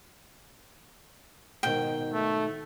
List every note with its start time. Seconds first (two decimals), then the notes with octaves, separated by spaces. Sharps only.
1.63 G#2 B2 D#3 G5
2.13 A3